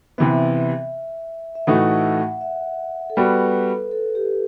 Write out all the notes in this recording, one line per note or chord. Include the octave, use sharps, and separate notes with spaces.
C3 E3 B3 E5
E5
A2 E3 A3 D#4 F#4 F#5
E5
A4
G3 B3 F#4 B4
A4
G4